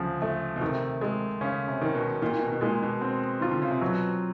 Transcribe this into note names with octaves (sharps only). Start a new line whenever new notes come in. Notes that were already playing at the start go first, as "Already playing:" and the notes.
Already playing: D2 C#3 F3
A3
B2
C3 D#3
G#3
C#3 C#4
C3
D#3
B2
A#2 D#3
A#2
B2
B2
A#2 G#3
B2
C4
D#3 F4
D3
C#3
C3
B2 F#3